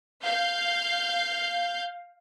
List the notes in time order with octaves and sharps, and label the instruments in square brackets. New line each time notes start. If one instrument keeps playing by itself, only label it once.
[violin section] F5 G6